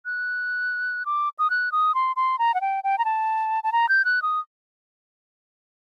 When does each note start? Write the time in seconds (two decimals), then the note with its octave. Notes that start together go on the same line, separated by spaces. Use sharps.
0.05 F#6
1.06 D6
1.39 D#6
1.50 F#6
1.72 D#6
1.95 C6
2.16 C6
2.39 A#5
2.54 F#5
2.61 G5
2.84 G5
2.98 A#5
3.05 A5
3.64 A5
3.72 A#5
3.89 G6
4.05 F#6
4.22 D#6